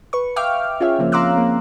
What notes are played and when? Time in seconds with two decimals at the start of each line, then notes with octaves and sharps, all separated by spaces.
0.13 B4 C#6
0.36 E5 F5 G5 D6 F6
0.80 C#4 F4 G#4 C#5 E5
0.99 C#3 F3 A#3 C4
1.12 F5 A#5 C6 D6 E6 F#6
1.38 A#3